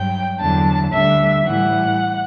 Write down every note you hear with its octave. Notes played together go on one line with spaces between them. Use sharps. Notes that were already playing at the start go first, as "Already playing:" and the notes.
Already playing: G2 F#3 G5
E2 D3 F#3 A5
D2 D3 G3 E5
A2 E3 G3 F#5